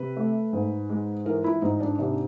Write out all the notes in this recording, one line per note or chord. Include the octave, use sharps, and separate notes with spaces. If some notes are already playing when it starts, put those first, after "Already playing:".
Already playing: C3 B4
A3
G#2
G#3
E3 A#4
E4
G#2 D#4
D4
C3 D4